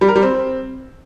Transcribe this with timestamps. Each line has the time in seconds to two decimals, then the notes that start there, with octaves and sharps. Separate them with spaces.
0.01 G3
0.08 A#4
0.16 G3
0.23 C4